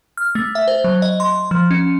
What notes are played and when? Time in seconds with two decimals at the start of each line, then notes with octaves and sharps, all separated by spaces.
0.17 F6
0.35 A3
0.55 E5
0.68 C5
0.84 F#3
1.02 D#5
1.20 C6
1.51 F3
1.71 C#4